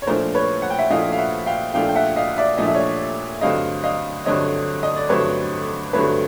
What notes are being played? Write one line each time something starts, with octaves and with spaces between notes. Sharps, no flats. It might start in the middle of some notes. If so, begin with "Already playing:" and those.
C#5
A#2 F3 A3 D4 A#4 C5
B4 C#5
F#5
G5
E5 F#5
A#2 F3 A3 D4 D#5 F5
F5
E5 F#5
F5 G5
A#2 F3 A3 D4 F5 G5
G5
E5 F#5
D#5 F5
D5 E5
A#2 F3 A3 D4 D#5
E5
C#5 D#5
G2 D3 F#3 A3 C4 D#5 F5
D#5 F5
G2 D3 F#3 A3 C4 C#5 D#5
D#5
D5
G2 D3 F#3 A3 C4 B4 C#5
G2 D3 F#3 A3 C4 B4 C#5